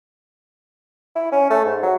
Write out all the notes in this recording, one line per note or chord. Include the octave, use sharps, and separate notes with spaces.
E4
C#4
A3
G#2
F#3